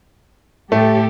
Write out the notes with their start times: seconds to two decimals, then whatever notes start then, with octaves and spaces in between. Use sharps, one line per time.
0.72 A2 A3 G4 A4